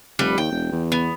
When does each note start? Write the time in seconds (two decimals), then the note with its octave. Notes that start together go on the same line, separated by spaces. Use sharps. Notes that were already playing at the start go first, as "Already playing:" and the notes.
0.19 F1 G3 B4
0.38 D#2 G5
0.52 E1
0.72 E2
0.92 B3